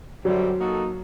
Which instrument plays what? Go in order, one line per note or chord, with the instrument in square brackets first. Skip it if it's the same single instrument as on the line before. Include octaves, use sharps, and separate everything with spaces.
[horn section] F#2 D3 G3 C4 [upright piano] F#3
[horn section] A#3 D#4 F#4 A4